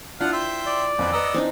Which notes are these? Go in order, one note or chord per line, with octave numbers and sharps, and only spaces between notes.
F3 D4 E4 F4 F#5 F6
C5 E5 G5
D5
F2 E3 C4 B4
B3 B4 D#5 A#5 E6
E3 C4 D4 D#4